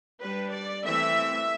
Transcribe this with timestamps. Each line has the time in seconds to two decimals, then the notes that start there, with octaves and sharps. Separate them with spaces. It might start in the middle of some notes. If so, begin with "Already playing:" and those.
0.21 G3 D4 B4
0.52 D5
0.84 E3 A3 C4 E5